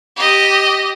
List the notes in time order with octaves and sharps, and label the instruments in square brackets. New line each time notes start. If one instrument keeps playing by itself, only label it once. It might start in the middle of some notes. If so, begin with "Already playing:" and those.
[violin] G4 D#5